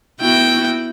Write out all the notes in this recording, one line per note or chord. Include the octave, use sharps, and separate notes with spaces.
B3 E4 F#4 G5